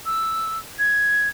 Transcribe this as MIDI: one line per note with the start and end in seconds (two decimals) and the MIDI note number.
0.06 0.59 88
0.79 1.29 92